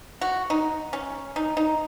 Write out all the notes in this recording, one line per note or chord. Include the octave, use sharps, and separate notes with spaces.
F#4
D#4
C#4
D#4
D#4